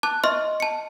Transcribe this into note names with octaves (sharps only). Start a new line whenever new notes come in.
A5 D6 F#6
D#5 E5 C6 C#6 F6
A5 C#7